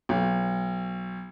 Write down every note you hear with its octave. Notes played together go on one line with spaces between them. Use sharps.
B1